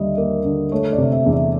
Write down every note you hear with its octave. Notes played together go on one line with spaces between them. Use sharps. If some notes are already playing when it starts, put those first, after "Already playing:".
Already playing: D#2 D3 G3 D#5 E5
A#3
D3
A3 C#5
D5
C3
E5
E2
E5